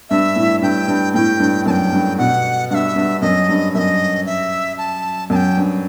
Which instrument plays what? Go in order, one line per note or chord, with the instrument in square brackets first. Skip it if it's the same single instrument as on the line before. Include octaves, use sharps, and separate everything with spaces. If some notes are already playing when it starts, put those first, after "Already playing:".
[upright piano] G2 [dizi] E5
[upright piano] A2
[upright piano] G2 [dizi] G5
[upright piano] G2
[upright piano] A2 [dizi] G5
[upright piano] G2
[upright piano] F#2 [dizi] A5
[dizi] G5
[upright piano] G2
[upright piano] B2 [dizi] F#5
[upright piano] G2 [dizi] E5 F#5
[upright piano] G2
[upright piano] F#2 [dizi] D#5
[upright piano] G2
[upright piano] F#2 [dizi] D#5 E5
[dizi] E5
A5
[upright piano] F#2 [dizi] A5
[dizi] G5
[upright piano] G2